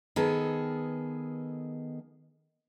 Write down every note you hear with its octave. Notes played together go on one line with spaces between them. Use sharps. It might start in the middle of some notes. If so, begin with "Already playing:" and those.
D#3 B3 G#4 A4